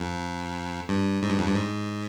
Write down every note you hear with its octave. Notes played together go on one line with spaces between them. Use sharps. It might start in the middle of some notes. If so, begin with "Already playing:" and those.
Already playing: F2
G2
G#2
G2
F2
G2
G#2